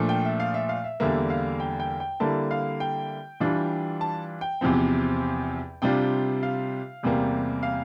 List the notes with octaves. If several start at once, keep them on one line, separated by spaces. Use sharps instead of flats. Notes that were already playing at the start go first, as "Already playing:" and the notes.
Already playing: A#2 F3 A3 D4
G5
E5
F5
E5
F5
E5
E2 D3 G3 A#3 E5
F5
G5
G5
G5
D3 G3 A#3 E4 A5
F5
G5
E3 G3 D4 F4
A5
G5
E2 C3 F3 C4
C3 G3 D4 F4 G5
F5
E2 C3 G3 A#3
F5